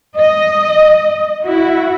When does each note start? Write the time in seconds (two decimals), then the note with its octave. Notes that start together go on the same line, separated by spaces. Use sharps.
0.18 D#5
1.44 E4 F#4